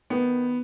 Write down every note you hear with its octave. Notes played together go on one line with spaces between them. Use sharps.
D#3 B3